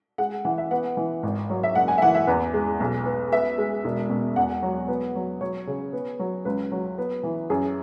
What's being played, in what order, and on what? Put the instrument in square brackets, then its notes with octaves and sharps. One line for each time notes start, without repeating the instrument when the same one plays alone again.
[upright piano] G#3 F#5
E3 F#5
E5
B3 F#5
E3
G#1
F#3
E5
F#1 F#5
G#5
E5
E3 F#5
E5
E2 B4
G#3
B1
B3
B3 E5
G#3
E1
B2
E2 F#5
F#3
B3
F#3
F#3 C#5
C#3
B3
F#3
C#2 B4
F#3
B3
E3
F#2 G#4